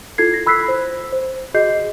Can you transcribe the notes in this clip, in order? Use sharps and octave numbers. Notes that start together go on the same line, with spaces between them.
E4 F4 A4 G#6 C7
A#6
B5 E6 F#6 B6 C7
C5
C5
F#4 G#4 D#5 G6 C7